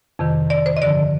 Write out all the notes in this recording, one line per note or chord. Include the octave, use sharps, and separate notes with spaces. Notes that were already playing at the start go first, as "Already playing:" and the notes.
F2 C3 D#3
D5
C5
D#5
G2 D3 F3 D5